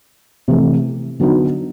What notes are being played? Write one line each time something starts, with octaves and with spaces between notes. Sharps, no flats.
C3 E3 A3
D3 F#3 B3 D#4